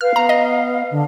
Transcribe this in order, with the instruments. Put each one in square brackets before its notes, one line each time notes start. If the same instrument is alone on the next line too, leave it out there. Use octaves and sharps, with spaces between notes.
[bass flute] B4 [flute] F5 [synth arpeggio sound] F6
[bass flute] B3 [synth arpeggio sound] A#5
[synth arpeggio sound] D#5
[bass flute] D3